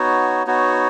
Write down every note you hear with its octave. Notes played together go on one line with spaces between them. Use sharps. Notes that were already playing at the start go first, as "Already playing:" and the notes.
Already playing: B3 D#4 F#4 C#5
B3 D#4 F#4 C#5